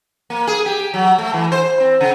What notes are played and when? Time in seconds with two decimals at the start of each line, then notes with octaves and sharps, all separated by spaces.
0.30 A#3
0.47 G#4
0.66 G4
0.94 F#3
1.18 A3
1.33 E3
1.52 C5
1.80 C4
2.01 C#3